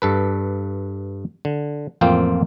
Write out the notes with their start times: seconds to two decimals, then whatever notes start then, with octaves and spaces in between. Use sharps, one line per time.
0.02 G2 A4 B4
1.45 D3
2.01 A1 F2 A#3 C4 F4 G5